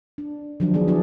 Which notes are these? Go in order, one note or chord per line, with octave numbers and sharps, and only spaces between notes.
D4
D3 D#3 F3 F#3 D4
D3 E3 F3 B3 G#4 D5
D4 E4 F#4 G#4 D5